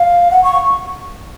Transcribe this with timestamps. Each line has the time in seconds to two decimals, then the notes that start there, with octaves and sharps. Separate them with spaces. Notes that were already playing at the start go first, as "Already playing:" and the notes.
Already playing: F5
0.31 F#5
0.44 C#6